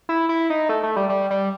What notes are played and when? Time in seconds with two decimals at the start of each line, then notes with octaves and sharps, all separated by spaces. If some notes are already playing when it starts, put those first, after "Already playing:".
0.09 E4
0.29 E4
0.50 D#4
0.69 A3
0.83 A3
0.96 G3
1.09 G3
1.31 G3